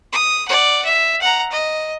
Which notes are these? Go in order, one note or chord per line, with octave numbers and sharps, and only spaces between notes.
D#6
D5 F#5
E5
F#5 A#5
D#5